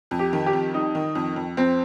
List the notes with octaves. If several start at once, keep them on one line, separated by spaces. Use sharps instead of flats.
F2
G4
D#3
G4
F2
G3 D#4
D#3
F2
F2
F2 C4